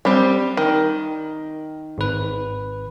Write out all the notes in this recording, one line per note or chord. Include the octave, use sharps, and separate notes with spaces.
G3 C4
D#3
G#1 B4